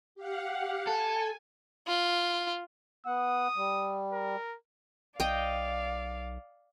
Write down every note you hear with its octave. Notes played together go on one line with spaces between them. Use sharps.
G4 F5 F#5
A4 G#5
F4
B3 F#5 D#6
G3
A#4
B1 D5 D#5 F5 G5